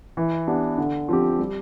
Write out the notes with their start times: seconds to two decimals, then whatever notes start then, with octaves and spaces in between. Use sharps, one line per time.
0.17 E3
0.47 B3 D4 G4
0.78 D3
1.08 F3 C4 G4
1.39 G3